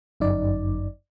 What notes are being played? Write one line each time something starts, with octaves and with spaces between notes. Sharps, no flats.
G1 F#2 D#4 D5